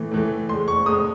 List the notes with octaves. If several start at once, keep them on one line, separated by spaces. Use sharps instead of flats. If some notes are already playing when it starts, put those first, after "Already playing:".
Already playing: A2 E3 A3
A2 E3 A3
A2 G#3 C6
C#6
A2 G#3 D#6